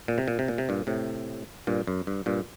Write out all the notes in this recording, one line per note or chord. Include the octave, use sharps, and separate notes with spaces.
A#2
C3
A#2
C3
A#2
C3
G2 A#2
A2 C3
G2 A#2
F#2
G2
G2 A#2